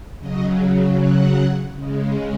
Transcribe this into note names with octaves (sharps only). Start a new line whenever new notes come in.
C#3 F#3 D#5
F#5
C#3 G#3